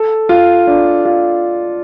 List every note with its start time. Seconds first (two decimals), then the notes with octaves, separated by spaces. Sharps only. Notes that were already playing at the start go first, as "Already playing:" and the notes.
Already playing: A4
0.29 F4
0.67 D4
1.05 F4